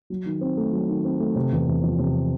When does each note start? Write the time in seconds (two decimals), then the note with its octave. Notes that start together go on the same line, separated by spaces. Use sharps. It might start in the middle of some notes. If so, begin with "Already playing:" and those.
0.10 F#3
0.26 D#3
0.41 C4
0.57 A3
0.73 F#3
0.88 D#3
1.05 C4
1.20 A3
1.35 C3
1.52 E2
1.68 E2
1.83 F3
1.99 C3